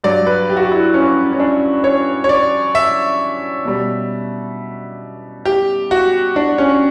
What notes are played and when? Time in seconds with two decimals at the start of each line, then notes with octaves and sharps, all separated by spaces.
0.04 G2 F#3 D5
0.26 B4
0.50 G4
0.57 F#4
0.63 G4
0.72 E4
0.94 C#4
1.33 C#4
1.40 D4
1.84 C#5
2.24 C#5
2.29 D5
2.75 E5
3.65 B2 G3
5.45 G4
5.91 F#4
6.36 D4
6.58 C#4